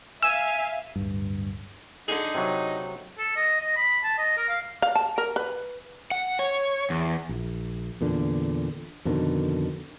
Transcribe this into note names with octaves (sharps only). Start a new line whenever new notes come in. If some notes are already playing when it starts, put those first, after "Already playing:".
E5 F5 G#5 E6
D1 G1 G2
D3 D#4 G#4
C3 F#3
A4
D#5
D#5
B5
A5
D#5
A#4
F5
F5
A5
A#4
B4
F#5
C#5
E2
A#1
E2 A#2 D3
F2 B2 D3 D#3